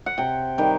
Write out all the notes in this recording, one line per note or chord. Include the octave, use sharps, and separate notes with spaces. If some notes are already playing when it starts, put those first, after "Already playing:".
F#5
C3 G5
D#3 G3 G5